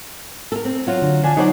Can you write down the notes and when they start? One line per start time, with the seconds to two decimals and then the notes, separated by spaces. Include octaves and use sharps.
0.52 A4 A#4
0.65 C4
0.87 F#3 F4
1.02 D3
1.23 F3 D4 G#5
1.37 F#3 D#4 C5 D5